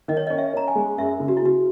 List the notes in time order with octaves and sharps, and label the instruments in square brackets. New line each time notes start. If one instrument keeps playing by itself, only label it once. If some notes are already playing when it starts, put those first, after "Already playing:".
[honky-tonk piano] D#3 [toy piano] D#5
[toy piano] C#5
D#5
[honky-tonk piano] C#4
[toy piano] E5
[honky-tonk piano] C#4 [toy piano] A#5
[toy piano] G#5
[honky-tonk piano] G#3
[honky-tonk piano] F#2 [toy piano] E5
[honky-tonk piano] C#3
[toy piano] F#4
E4
[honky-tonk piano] C#3 [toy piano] F#4